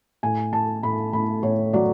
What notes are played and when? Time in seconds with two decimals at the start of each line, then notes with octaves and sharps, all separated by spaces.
0.23 A2 G#5
0.53 A2 A5
0.83 A2 B5
1.13 A2 B5
1.43 A2 C#5
1.73 F#3 D5